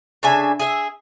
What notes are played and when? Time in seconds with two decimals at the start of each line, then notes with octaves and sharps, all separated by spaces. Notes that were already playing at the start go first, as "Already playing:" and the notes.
0.23 C#3 D4 E5 G#5
0.60 G#4 E5